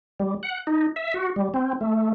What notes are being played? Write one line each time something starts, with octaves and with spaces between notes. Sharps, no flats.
G3
F#5
D#4
E5
F#4
G3
C4
A3